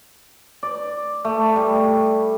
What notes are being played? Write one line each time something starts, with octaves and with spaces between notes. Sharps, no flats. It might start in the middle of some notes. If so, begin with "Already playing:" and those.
D5
A3
G3